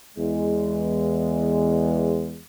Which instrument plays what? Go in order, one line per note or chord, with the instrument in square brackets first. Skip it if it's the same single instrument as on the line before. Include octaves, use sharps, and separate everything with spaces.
[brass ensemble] E2 G#3